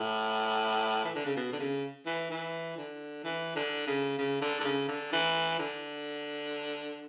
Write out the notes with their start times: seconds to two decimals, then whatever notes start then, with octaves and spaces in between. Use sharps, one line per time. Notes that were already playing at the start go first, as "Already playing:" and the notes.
Already playing: A2
1.05 E3
1.16 D3
1.26 C#3
1.36 B2
1.53 D3
1.60 C#3
2.06 E3
2.31 E3
2.78 D3
3.25 E3
3.56 D3
3.87 C#3
4.19 C#3
4.42 D3
4.60 D3
4.65 C#3
4.88 D3
5.13 E3
5.60 D3